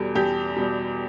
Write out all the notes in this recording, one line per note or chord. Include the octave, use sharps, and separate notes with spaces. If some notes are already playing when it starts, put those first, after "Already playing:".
Already playing: E2 B2 G3 A4
E2 G4
B2 G3